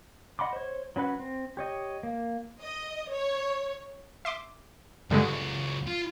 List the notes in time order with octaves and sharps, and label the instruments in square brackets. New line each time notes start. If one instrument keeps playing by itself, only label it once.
[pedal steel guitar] D#5 F#5 B5 C6 D6
C5 C#5
F#3 C#4 B4 F#5
C4
G4 C#5 D#5
A#3
[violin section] D#5
C#5
[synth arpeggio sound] E5 C6 D6
[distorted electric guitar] C#2 F#3 [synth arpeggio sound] G2 D3 G#3
[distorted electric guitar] F4